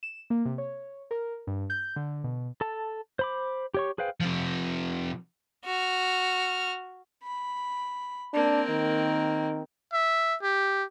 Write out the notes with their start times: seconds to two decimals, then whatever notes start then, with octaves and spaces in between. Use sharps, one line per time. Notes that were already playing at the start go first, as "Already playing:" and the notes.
0.03 E7
0.30 A#3
0.45 C3
0.58 C#5
1.11 A#4
1.47 G2
1.70 G6
1.96 D3
2.24 B2
2.61 A4 A5
3.19 C5 B5 D6
3.74 G4 C#5 C#6
3.98 G#4 B4 C5 F5 G5
4.20 C3 F3
5.65 F#4 F6
7.23 B5
8.33 A#3 C4 D4
8.70 D#3
9.93 E5
10.42 G4